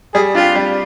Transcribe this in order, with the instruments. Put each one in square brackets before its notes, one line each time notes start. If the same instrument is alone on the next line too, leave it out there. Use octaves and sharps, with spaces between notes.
[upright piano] G3 [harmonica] G#4
[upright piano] D4 G4 [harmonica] F4
[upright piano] G3